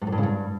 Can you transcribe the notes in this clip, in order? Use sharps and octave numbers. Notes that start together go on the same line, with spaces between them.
G2
F#2
G2
C#3
G2